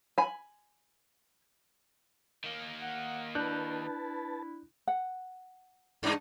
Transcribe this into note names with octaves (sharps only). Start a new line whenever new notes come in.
G#5 B5
D#3 A#3
F#5
D4 E4 B4 A5 F#6 G6
F#5
G2 D4 D#4